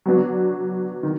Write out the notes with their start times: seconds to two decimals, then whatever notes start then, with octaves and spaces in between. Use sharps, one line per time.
0.06 F#3 B3 D4 F#4
1.03 D#3